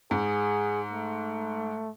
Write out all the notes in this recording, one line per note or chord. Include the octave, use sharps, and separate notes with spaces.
G#2 G#4
A3